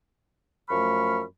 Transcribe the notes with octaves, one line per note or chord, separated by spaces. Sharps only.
F#2 F3 A3 B5 C#6 F6